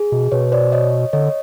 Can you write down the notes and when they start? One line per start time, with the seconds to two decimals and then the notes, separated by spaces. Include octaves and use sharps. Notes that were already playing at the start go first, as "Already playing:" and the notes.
Already playing: G#4
0.12 B2
0.32 B2 B4 C#5
0.52 C5 D5
0.72 C#5 D#5
1.13 D3 C#5 D#5